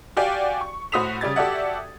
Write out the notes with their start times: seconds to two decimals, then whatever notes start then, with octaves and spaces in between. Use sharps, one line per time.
0.17 F#4 G4 D5 F5 G5 G#5
0.61 C#6
0.92 A2 F#4 C5 D#6 B6 F7
1.21 C#3 G3 D5 G#6 A6
1.36 F#4 G4 A4 D5 E5 F#5